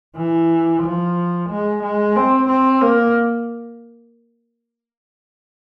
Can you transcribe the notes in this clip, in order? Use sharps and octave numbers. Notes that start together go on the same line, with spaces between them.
E3
F3
G#3
G#3
C4
C4
A#3